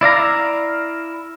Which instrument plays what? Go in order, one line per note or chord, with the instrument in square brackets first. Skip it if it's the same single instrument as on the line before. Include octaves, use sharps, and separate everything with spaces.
[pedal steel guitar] E4 D5 F5 A#5